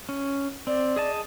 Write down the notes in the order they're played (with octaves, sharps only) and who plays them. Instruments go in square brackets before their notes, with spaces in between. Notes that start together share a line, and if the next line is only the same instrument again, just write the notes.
[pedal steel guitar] C#4
[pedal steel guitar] C4 [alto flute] D5
[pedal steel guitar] G#4 D#5 A5